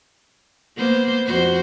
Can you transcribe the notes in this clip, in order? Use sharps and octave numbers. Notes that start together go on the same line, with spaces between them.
A#3 B3 C5
F2 F#4 C5